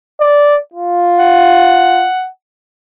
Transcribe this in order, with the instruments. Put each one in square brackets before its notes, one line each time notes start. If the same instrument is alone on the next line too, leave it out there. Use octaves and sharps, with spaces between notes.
[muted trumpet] D5
F4
[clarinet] F#5